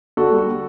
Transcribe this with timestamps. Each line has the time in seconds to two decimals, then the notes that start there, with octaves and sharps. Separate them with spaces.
0.17 D3 F#4 A4
0.33 G3